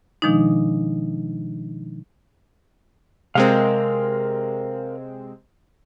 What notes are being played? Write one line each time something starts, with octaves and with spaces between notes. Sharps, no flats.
B2 D#3 F3 G#3 D4 D#4
C3 G#3 C4 A#4 F5